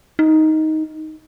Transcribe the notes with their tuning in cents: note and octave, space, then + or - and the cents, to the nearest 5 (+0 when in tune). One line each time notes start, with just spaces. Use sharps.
D#4 +10